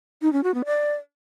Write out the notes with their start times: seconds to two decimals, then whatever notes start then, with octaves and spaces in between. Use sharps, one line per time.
0.22 D#4
0.33 C#4
0.44 F#4
0.54 B3
0.65 D5